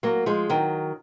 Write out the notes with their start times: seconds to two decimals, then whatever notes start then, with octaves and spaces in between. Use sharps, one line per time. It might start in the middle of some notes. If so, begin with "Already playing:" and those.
0.03 F#3 A#3
0.26 F3 G#3
0.49 D#3 F#3